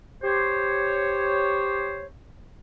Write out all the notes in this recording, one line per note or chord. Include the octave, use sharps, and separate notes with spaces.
G4 C5 C#5